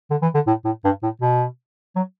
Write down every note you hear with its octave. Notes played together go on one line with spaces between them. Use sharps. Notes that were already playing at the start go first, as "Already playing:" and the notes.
D3
E3
D3
A2
A2
G2
A2
B2
F#3